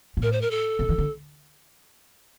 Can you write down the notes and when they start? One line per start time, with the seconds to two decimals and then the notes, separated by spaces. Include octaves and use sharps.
0.17 A#2
0.22 A2 A#4
0.32 C5
0.41 A#4
0.51 A4
0.79 C3
0.89 D#3
0.98 D3